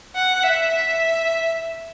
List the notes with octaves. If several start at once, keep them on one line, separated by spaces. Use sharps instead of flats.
F#5
E5
E5